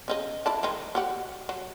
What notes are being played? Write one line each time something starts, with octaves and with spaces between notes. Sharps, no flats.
C#3 D#4 D#5
E4 D5 A5
D#3 G#3 D#4
F#4 G4 F#5
F#3